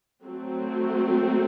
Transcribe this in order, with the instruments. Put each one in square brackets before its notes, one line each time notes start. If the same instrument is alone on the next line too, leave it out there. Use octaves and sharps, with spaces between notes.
[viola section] F#3 A3 C4